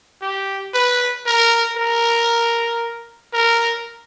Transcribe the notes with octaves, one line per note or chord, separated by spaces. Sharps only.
G4
B4
A#4
A#4
A#4